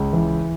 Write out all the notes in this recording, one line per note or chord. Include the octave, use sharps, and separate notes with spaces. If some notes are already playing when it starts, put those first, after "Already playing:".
Already playing: C#2
E3